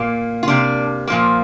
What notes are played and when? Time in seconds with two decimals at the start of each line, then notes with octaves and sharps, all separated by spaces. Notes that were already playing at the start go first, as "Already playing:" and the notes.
Already playing: A#2 A#3
0.43 F4
0.48 C3 A#3 D4
1.08 A#2 F3 A#3